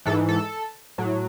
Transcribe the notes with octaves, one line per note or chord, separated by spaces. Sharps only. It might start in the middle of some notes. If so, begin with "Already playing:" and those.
G#2 E3 A4
A4
A2 F#3